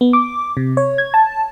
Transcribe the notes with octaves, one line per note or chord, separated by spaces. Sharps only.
B3
D6
C3
C#5
G#6
A5